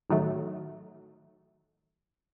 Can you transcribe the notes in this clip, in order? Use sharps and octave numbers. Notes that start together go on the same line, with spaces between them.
A1 D#3 F#3 A3